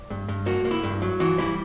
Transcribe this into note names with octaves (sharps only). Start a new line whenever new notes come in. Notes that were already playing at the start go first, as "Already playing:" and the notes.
Already playing: D5
G2
G2
A#3 F#4
A#3
E4
G2
F#3
E3 F#4
G3 E4